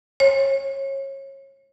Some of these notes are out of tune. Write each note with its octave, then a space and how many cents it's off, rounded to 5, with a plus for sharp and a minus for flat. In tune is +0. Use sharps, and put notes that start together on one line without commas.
C#5 -30